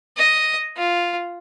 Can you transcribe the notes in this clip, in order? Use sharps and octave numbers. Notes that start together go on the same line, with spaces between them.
D#5
F4